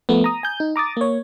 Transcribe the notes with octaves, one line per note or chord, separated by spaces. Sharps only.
F3 A3 B3
A#5 D#6
G#5 G6
D#4
A#5 D6 D#6 A6
A#3 C#5